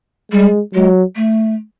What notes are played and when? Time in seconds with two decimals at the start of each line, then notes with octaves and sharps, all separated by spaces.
0.32 G3 G#3
0.74 F#3 G#3
1.16 A3